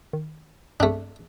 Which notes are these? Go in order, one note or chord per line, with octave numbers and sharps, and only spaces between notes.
D#3
G2 A3 C4 D4